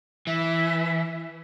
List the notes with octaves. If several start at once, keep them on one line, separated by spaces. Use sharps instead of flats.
E3 E5